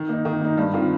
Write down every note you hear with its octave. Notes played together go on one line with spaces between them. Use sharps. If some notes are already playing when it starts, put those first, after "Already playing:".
Already playing: D#3
A#3 D#4
D#3
A#3 D#4
G2
D#3 C4 F4